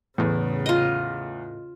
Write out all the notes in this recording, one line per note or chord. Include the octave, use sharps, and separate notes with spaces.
E2 A2 C#3
F4 D#5